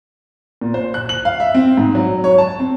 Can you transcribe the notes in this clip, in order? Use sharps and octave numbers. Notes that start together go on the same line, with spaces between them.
A#2
C5
F#6
F#7
F5
E5
C4
G#2
F#3
C#5
A5
C4